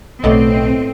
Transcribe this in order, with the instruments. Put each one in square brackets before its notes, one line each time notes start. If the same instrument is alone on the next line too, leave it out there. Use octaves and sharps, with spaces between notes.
[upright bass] B1 D#3 [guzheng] A2 B3 D5 [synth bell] A3 D#5 [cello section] C4